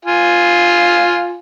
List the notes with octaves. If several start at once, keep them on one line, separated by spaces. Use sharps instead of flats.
F4 F5 G#5